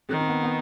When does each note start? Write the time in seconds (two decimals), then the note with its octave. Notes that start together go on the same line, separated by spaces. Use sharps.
0.09 D#3 C4
0.20 C4
0.29 B3
0.43 B3